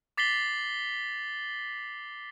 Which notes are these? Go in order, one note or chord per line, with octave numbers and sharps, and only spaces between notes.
D6 A6 B6 C7 F#7 G7